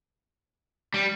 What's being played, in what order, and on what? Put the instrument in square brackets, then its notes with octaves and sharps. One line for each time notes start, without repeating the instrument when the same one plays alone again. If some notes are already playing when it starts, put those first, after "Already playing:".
[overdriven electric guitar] G3